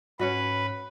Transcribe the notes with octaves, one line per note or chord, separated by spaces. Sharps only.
G#2 C#4 D4 F#4 B4